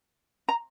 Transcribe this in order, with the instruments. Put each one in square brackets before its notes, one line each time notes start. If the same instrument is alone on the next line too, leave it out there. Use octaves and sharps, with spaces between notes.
[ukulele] A#5